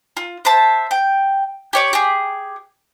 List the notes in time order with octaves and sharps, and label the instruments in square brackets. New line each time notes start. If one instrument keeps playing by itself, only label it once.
[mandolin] F4
C5 E5 A5
G5
G4 C#5 D5
G4 G#4